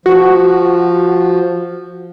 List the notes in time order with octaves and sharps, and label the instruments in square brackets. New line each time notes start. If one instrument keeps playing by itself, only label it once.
[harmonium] F3 [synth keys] F#4